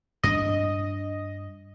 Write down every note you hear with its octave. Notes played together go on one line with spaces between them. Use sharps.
G2 C4 D4 D#5